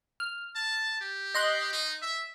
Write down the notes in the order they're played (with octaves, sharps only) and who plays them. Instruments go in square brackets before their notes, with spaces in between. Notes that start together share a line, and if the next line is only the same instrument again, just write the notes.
[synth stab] F6
[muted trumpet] A5
G4
[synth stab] D#5 C6 F#6
[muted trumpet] D#4
E5